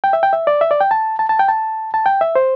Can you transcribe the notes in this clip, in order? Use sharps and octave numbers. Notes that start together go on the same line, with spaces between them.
G5
E5
G5
E5
D5
E5
D5
G5
A5
A5
A5
G5
A5
A5
G5
E5
C5